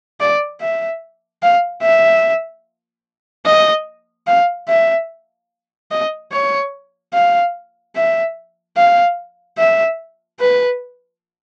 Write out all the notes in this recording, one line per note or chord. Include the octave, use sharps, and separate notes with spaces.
D5
E5
F5
E5
D#5
F5
E5
D#5
C#5
F5
E5
F5
E5
B4